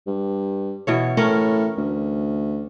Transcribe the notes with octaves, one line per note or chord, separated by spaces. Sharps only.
G2
B2 E3 C#5
A2 C#4 A#4 C#5
D2